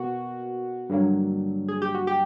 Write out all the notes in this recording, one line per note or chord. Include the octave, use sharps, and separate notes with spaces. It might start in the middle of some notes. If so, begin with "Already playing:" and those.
Already playing: B2 A#3 F#4
G2 D3 F#3 A#3
G#4
G4
F#4
G4